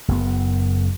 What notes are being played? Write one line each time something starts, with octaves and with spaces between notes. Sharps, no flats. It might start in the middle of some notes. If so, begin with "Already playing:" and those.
F#1 B3